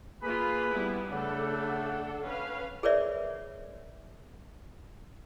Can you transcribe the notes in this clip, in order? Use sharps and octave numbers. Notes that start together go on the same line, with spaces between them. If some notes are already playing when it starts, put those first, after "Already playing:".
A#3 F4 G#4 B4 B5
G3 B3 E4
C#3 A3 D4 A4 F#5
C#4 B4 F5
G#4 A#4 B4 C#5 D5 E5